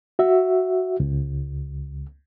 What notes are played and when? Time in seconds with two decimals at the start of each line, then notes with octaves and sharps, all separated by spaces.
0.19 F#4 E5
1.00 C#2